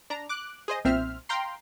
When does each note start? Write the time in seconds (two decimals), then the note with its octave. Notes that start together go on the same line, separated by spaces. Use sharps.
0.10 D4 A#5
0.29 D6 F#6
0.68 G#4 C5 D#5
0.85 B1 A#2 C4 C5 E5 F6
1.29 F5 G5 A#5 C6